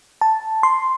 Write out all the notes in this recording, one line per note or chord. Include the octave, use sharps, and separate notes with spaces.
A5
C6